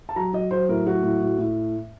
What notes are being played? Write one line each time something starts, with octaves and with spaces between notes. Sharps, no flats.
A5
F#3 A#5
F#3 D#5
F#3 C5
A2 A#4
F#3 F#4
A2
A2
A2